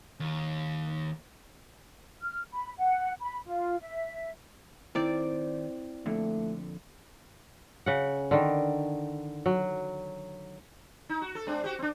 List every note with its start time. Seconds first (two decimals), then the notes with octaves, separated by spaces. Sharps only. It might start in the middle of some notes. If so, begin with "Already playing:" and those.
0.20 D#2
2.21 F6
2.52 B5
2.78 F#5
3.20 B5
3.47 F4
3.81 E5
4.95 D#3 C4 E4 D5
6.06 F2 A#2 D3 A3
7.86 C#3 F#5
8.31 D3 D#3
9.46 F#3
11.09 D#4
11.21 F#4
11.35 A4
11.47 G#3 C4 D4
11.64 F#4 G4
11.79 C4 D4